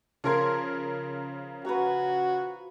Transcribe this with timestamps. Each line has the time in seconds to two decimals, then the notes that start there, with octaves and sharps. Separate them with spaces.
0.24 C#3 F3 A#4 C6 G#6
1.65 F#4 B4 A#5